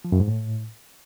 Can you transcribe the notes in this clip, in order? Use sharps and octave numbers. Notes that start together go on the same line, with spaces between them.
F3
F#2
G#2
A2